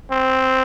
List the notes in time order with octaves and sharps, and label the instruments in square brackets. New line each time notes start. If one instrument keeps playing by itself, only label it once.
[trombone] C4